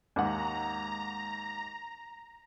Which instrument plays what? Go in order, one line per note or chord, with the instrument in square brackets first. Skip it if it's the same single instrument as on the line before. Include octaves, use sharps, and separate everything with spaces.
[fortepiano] D#2 G#2 F#5 [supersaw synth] A#5